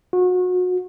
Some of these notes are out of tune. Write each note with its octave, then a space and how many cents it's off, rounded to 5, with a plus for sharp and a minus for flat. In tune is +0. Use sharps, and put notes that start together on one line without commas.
F#4 -30